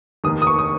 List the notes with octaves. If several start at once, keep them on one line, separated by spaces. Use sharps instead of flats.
F1 D#2 D#3 D#6
D#6
C#6
D#6